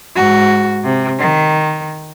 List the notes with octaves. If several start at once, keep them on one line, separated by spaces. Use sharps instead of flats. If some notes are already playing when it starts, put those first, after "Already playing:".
G#2 F#4
C3
D#3